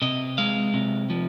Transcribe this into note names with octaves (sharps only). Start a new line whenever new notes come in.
C3 D#5
G#3 F5
C3
F3